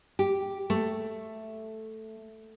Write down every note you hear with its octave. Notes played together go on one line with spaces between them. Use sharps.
G4
A3